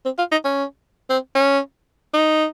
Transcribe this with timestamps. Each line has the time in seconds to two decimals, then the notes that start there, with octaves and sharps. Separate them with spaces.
0.05 C4
0.19 F4
0.32 D#4
0.45 C#4
1.10 C4
1.35 C#4
2.14 D#4